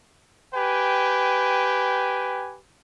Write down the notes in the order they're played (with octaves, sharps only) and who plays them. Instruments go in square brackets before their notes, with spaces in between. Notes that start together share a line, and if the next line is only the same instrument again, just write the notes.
[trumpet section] G4 B4 G5 G#5